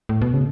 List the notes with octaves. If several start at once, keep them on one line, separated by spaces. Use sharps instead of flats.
A2
B2
C#3